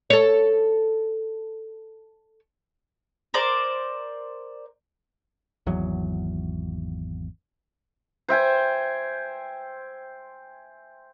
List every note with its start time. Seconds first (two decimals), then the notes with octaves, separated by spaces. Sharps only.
0.10 A4 C#5
3.34 A#4 C5 D5
5.66 G#1 E2 F#3
8.28 C5 E5 G5 G#5